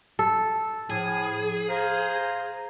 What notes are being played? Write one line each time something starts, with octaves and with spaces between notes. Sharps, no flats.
A4
A2 F3 G#4
C5 F5 A#5